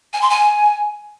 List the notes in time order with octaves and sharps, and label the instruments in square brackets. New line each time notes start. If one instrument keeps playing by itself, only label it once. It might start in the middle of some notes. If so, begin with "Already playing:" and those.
[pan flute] G#5
C6
G#5